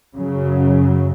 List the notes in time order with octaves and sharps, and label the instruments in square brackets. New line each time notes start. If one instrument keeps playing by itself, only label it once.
[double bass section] F#2 C#3 F#3